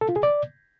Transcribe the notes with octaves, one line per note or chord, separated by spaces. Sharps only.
A4
F4
G#4
D5